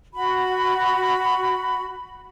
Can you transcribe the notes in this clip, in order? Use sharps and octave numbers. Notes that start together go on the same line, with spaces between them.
F#4 B5